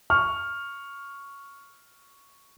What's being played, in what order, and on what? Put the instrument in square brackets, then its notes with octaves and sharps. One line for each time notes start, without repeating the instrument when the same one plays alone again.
[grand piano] C#6 F6